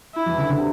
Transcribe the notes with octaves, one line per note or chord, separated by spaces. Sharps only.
E4
E2 E3
D3
D3
C3